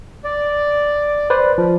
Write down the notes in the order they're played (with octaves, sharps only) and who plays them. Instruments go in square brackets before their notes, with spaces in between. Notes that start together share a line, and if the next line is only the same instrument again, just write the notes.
[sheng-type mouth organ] D5
[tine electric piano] B4 C5 D5
F3